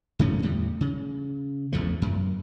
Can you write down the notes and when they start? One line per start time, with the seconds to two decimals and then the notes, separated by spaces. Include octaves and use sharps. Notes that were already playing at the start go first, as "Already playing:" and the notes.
0.19 F#2 D3 A3 C#4
0.42 E2 A2 G3
0.81 C#3
1.73 A1 E2 F3 A3
2.02 F#2